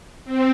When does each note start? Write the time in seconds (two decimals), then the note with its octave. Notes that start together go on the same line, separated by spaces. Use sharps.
0.25 C4